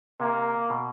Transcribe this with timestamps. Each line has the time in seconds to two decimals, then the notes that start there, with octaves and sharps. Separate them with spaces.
0.20 C3 A#3
0.70 B2